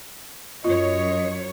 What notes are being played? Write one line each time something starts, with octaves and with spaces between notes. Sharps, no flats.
F#2 F4 C#5 D#5